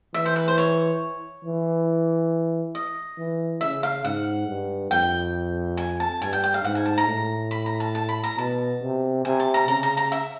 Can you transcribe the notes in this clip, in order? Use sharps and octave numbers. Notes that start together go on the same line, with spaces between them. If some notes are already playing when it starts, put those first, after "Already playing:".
E3 E5
C5
B4
C5
C#5
E3
D#5
E3
C#3 E5
F5
G#2 F#5
G2
F2 G5
G#5
A5
G2 G#5
G5
G5
F5
G#2 F#5
G#5
A5
A#5
A2
B5
A#5
A5
A5
B5
A#5
B2 A5
C3
C3 G#5
A5
A#5
C#3 A#5
A#5
A#5
E5